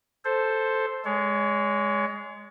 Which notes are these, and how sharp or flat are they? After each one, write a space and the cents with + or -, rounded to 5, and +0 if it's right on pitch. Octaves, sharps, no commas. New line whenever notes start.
A4 +0 C5 +0
G#3 +0 C#5 +35